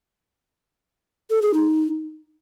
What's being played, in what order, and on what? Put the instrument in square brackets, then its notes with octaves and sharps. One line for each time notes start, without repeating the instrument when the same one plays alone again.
[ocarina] A4
G#4
D#4